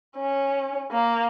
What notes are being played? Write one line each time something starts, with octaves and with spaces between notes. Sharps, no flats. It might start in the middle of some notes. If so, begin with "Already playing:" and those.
C#4
A#3